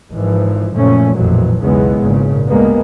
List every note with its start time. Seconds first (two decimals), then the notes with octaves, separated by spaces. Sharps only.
0.11 G#1 G#2 E3 F3
0.74 F#1 A#2 F3 A3 C#4
1.15 A1 F2 A#2 E3 F#3
1.61 B1 E2 C#3 E3 G#3 B3
1.99 G#1 A#2 C#3
2.48 D2 G3 G#3 A#3 B3